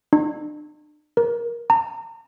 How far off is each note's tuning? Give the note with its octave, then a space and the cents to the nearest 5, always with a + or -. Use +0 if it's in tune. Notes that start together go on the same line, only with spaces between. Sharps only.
D4 +45
A#4 +15
A#5 -35